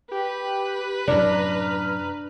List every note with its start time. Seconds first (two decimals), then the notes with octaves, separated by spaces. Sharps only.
0.12 G4 B4
1.08 F#2 A2 C3 D4 A#5 F6